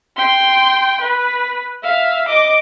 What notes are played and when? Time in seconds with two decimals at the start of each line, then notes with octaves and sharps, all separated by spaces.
0.17 G5 C6
1.01 B4
1.83 E5 F5
2.28 D#5 D6